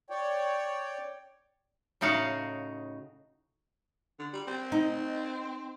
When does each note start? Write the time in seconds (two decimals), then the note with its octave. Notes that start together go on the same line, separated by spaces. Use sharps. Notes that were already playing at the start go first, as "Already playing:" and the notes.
0.10 C#5 D5 G5
2.01 A2 C#3 D#4 F#4 F5
4.19 D3
4.33 G3
4.47 C4
4.72 D#4